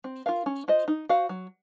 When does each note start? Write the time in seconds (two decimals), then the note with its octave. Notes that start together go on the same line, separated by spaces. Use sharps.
0.04 C4
0.26 F4 A#4 F5
0.46 C#4
0.68 F4 C5 D#5
0.88 D#4
1.09 F#4 C5 F5
1.29 F#3